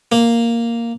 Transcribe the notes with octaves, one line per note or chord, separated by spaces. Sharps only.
A#3